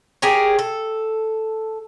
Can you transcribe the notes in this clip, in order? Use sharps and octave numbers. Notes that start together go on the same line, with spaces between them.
G4 G#4 A#4 C#5
A4